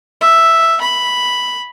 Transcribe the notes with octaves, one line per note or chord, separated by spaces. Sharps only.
E5
B5